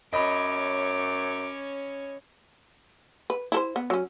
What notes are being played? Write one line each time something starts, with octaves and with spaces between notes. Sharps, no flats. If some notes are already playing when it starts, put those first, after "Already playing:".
F#2 C#4 C#5 D#5 B5 D6
B4
E4 A4 C5
B3
F#3 C#4